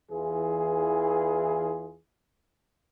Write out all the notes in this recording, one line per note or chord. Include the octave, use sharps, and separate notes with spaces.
E2 E3 F4 G#4